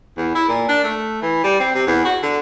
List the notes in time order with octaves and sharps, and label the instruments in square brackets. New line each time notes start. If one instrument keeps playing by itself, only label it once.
[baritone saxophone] E2
E4
A#2
D4
A3
E3
G3
C4
C3
E2
F#4
D3